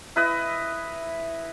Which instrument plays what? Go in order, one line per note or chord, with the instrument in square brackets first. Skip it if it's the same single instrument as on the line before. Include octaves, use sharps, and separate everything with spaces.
[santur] E4 B4 D#5